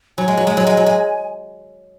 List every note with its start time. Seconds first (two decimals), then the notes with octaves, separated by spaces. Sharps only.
0.18 F#3 G#5
0.28 G#3
0.37 F#3
0.47 G#3
0.57 F#3
0.67 G#3
0.77 F#3
0.86 G#3